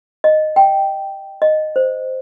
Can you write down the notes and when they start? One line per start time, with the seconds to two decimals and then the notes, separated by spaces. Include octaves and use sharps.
0.24 D#5
0.56 G5
1.42 D#5
1.76 C5